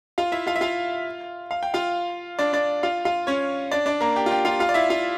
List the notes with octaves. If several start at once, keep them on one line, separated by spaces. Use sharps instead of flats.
F4 F5
E4 E5
F4 F5
E5
F4 F5
F5
G5
F4 F5
D4 D5
D4 D5
F4 F5
F4 F5
C#4 C#5
D4 D5
D4 D5
A#3 A#4
G4
F4
G4
F4 F5
F4 F5
D5
E4 E5
F4 F5